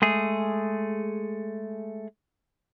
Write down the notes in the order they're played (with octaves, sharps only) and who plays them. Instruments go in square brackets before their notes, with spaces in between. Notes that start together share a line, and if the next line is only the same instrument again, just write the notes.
[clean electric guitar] G#3 A3 G#4